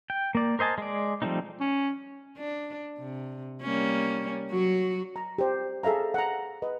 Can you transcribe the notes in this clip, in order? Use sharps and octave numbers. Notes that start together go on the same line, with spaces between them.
G5
A#3 D5
A#4 C5 D#5 G#5 A5
G#3 D5
F3 G3 A3 C4 D#4
C#4
D4
C3
G3 A#3 C#4
F#3 F#4
A#5
G4 C5
G#4 A4 E5 F5 A#5
F#5 A#5
B4 D#5